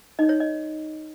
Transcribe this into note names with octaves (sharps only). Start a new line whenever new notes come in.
D#4 A4 C#5 D#5
C#5
D#5